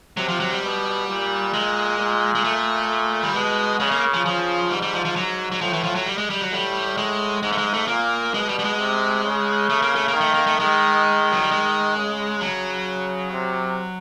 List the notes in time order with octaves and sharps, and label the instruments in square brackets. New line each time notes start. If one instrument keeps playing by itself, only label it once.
[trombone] C3 [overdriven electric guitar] F#3
[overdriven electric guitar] F3
F#3
G3
[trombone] B2
A#2
[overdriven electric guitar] G#3
[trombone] A#2
[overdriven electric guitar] G#3
A3
G3
[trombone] B2 [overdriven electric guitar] G#3
[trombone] C#3 [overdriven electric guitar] G#3
[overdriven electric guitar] A#3
F3
[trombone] C#3 [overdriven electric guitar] F3
[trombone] G#2 [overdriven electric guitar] G3
[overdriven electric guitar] G3
F3
F3
[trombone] G#2 [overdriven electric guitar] F#3
[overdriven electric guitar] F#3
[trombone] A2 [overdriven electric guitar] F3
[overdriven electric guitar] E3
F3
F#3
G3
G#3
G3
F#3
[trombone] A2 [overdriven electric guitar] G3
[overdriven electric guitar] G#3
[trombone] G#2 [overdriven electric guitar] G#3
[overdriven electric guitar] A3
G#3
A3
[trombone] A#2 [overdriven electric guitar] A#3
[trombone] B2 [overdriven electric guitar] G#3
[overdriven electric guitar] G3
G3
G#3
[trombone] C3
C#3
[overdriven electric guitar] A3
A#3
A3
A#3
[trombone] D#3
[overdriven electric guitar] A3
A#3
A3
[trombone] D#3 [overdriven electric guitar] G#3
[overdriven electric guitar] F#3
G3
G#3
[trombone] C#3
[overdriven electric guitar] F#3
[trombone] C3